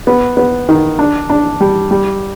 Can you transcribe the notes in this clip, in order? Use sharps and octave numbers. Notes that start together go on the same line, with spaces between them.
B3
B3
D#3
D4
D4
G3
G3